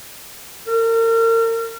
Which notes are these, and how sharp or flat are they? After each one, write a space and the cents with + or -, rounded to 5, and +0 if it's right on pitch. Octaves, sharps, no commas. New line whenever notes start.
A#4 -40